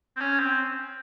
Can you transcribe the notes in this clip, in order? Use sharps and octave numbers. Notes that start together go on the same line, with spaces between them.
C4
C#4
C4